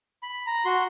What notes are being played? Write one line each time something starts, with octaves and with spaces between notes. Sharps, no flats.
B5
A#5
F#4 C6